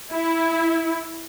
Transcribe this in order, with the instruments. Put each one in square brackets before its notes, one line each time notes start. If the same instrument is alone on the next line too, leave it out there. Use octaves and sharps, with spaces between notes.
[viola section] E4